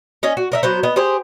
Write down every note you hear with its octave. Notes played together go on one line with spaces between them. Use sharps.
C#4 D#5
F#4
A#4 D#5 E5
F#3 B3 C5
B3 D#5
G4 G#4 C5